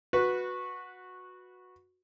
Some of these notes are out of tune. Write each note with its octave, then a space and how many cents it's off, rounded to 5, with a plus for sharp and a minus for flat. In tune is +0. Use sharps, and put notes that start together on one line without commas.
F#4 -15 B4 -5